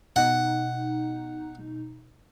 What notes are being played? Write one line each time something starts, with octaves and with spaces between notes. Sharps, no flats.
B2 D#4 F#5